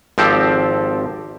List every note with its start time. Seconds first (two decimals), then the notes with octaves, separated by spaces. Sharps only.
0.18 G#1 F3 C4 G4 A4